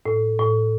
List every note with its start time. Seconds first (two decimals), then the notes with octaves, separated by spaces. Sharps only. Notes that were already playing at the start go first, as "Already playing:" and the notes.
0.06 A2
0.39 A2